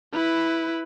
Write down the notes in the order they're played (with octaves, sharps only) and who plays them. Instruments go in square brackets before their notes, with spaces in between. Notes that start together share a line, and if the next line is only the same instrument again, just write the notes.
[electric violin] E4 B4